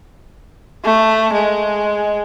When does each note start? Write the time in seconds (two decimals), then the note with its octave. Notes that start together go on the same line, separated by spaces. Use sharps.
0.84 A3
1.33 G#3